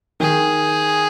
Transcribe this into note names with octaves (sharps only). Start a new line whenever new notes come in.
D#3 G#4